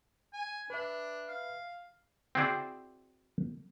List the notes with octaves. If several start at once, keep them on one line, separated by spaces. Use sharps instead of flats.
G#5
D4 B4 E5
F5
C4 E4 F#4 G#4 C5 D5